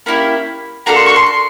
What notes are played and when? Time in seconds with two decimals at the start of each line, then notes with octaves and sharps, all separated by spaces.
0.06 A#3 C#4 E4 G4 B5
0.86 A#3 D4 F#4 A4 A#5
0.96 C6
1.06 C#6
1.16 C6
1.26 C6